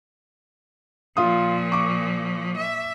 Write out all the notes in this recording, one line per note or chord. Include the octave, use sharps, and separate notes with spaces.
A#2 F3 F4 D#6
C#6 D6
E5